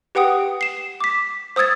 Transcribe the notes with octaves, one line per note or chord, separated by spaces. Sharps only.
G4 B4 F#5 G5 D#6
C7 E7
D6 B6
C5 D#6 E6 G#6 A6